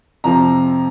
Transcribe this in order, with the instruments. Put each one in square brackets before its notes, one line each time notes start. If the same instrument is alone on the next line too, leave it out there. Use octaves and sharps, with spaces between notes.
[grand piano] F2 C3 F3 A#5